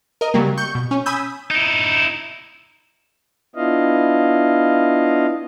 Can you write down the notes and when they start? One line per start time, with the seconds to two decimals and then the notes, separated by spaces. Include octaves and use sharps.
0.21 A#4 D#5
0.34 C#3 F#3 G3 A#3
0.58 C#6 G6
0.75 B2
0.91 C#4
1.06 G#5 B5 D#6 E6 G6
1.51 D#4 E4
3.56 B3 D4 E4 F4 D#5 F5